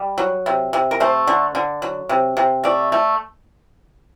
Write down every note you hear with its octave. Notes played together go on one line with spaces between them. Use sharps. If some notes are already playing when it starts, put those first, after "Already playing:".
Already playing: G3
F#3
C3
C3
A#4
A3 C5
D3
D3
F#3
C3
C3
A3 D5
A3